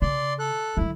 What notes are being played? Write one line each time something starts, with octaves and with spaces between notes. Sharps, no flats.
C#3 D5 C6
A4 F#6
D3 F#3 E4